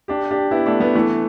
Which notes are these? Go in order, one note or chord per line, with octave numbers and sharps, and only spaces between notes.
D4 G4
D4 G4
B3 E4
A3 D4
G3 B3
E3 A3